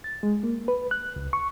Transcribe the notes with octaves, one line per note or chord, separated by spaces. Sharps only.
A6
G#3
A#3
B4
F#6
C#2
C#6